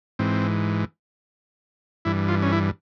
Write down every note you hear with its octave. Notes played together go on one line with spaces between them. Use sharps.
G#2 E3 C4
G2 E3 E4
F4
C#4
E4